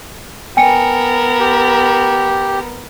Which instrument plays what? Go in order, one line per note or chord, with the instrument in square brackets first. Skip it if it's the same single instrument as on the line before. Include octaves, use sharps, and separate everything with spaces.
[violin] B3 A#4 [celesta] G5 G#5 C#7
[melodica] G4